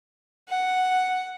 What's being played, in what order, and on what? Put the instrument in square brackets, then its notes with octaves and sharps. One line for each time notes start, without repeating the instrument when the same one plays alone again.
[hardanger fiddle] F#5